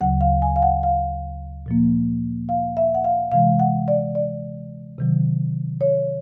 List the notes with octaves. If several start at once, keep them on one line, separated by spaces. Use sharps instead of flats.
D2 C#3 F#3 F#5
F5
G#5
F5
F#5
F5
A#2 F3 A#3
F5
E5
F#5
F5
C3 E3 G#3 F5
F#5
D5
D5
C3 D#3 F#3
C#5